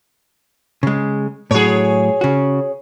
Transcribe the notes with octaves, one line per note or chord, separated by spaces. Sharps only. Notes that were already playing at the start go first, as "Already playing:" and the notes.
C#3 G#3
A2 F#3 G#4 C#5
C#3 F#4